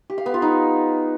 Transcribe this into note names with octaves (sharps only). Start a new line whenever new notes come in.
G4
F5
B3
F4
D#4